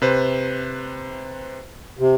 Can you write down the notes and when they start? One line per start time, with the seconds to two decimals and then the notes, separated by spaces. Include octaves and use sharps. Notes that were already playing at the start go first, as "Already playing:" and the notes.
0.02 C3 B4 C5
1.99 C3